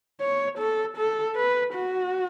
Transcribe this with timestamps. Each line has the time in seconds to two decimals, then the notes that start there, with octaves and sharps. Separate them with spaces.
0.21 C#5
0.58 A4
0.97 A4
1.36 B4
1.74 F#4